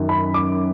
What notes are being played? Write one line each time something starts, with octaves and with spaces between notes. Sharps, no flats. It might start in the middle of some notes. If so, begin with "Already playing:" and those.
Already playing: F#2 D#3 F#3
B5
D6